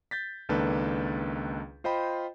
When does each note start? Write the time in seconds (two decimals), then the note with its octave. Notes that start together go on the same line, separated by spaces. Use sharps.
0.11 G6 A6 B6
0.49 C#2 D#3 A#3 D4 A4 B4
1.84 F4 C5 D#5 G5 B5